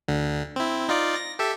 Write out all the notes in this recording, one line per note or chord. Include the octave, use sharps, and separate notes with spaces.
D2 D3
C4 E4
D#4 F4 D5
A#6
G4 A4 E5